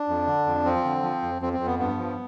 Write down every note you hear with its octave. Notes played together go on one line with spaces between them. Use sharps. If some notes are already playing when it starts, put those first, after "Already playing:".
Already playing: D4
F2
D3
F2
F3 C4
D3
F3
F2
F2 C4
C4
F2
B3
G2 B3
F3